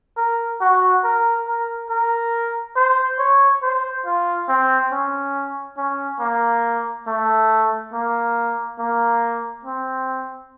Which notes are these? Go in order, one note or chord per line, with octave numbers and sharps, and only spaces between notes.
A#4
F#4
A#4
A#4
A#4
C5
C#5
C5
F4
C4
C#4
C#4
A#3
A3
A#3
A#3
C4